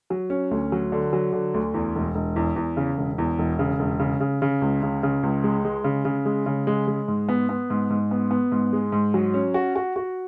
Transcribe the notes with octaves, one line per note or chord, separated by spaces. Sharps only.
F#3
C#4
D2
F#3
D3
F#3
D3
D2
E2
E1
E1
E2
E2
C#3
E1
E2
E1
C#3
E1
C#3
C#3
C#3
C#2
C#3
C#3
C#2
G#3
G#3
C#3
C#3
G#3
C#3
G#3
G#3
G#2
B3
B3
G#2
G#2
B3
B3
G#2
G#3
G#2
F#3
C#4
F#4
F#4
F#4